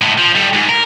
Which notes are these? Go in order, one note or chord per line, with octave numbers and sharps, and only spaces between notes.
A2 G#3
F3
G3 A4
G#2
A#4